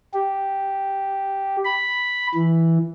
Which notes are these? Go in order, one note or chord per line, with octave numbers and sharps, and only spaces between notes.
G4
B5
E3